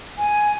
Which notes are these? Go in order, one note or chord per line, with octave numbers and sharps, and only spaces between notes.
G#5